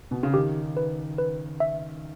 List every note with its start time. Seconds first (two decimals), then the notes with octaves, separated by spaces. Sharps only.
0.11 B2
0.23 C#3
0.34 D#3 G4
0.77 B4
1.18 B4
1.60 E5